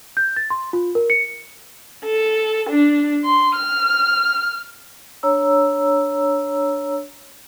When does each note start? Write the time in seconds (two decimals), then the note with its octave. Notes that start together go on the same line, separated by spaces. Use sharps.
0.17 G6
0.36 A6
0.50 C6
0.73 F4
0.95 A#4
1.10 C#7
2.05 A4
2.71 D4
3.26 C6
3.55 F6
5.23 D4 C#5 A#5 E6